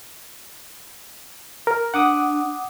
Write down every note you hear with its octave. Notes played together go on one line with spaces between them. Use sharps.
A#4
D4 F#5 D6 D#6